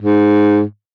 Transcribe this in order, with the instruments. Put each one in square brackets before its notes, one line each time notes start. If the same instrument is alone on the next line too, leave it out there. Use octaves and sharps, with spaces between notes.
[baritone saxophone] G#2